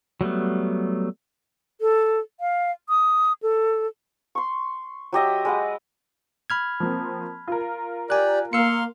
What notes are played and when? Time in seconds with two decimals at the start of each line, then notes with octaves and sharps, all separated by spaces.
0.21 F#3 G3 A3 B3
1.81 A4
2.40 F5
2.89 D#6
3.43 A4
4.35 C6 C#6
5.13 F#3 G4 D#5 E5
5.45 G#3 B4 F#5
6.50 B5 F6 G#6
6.80 F3 A#3 C4
7.48 F4 A#4
8.10 G4 D5 G#5 F#6
8.53 A#3 F5 C6 E6 C#7